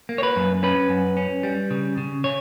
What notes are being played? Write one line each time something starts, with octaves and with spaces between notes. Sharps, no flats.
A#3
C#5
B4
F#2
C#4 B4
F#2
C#4
G3
C#3
C#3
C#3 C#5